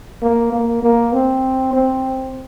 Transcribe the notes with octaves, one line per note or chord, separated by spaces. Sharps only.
A#3
A#3
A#3
C4
C4